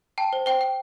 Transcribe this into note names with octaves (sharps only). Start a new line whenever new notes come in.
G5 A5
C5
C5 G5
G5